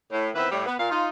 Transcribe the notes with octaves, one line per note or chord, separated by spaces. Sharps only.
A2
D#3 B3 C4 E4 B4 E5
A2 G3
B3
A#2 F5
D#4 F4